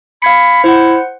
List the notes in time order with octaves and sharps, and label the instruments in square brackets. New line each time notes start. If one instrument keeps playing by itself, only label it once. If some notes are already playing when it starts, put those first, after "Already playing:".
[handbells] F5 G#6 C#7 [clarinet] B5
[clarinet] E4 [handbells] C5 F#5